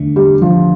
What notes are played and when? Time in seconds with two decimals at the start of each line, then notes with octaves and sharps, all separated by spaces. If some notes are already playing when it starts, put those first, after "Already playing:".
Already playing: E2 D3 A3 D4
0.16 G3
0.42 F3